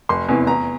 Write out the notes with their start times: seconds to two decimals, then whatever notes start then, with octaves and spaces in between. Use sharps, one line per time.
0.09 F1 C6
0.29 E2 C3 E3
0.47 E2 A#5